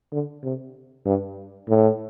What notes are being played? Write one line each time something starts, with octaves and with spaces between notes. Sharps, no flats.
D3
C3
G2
A2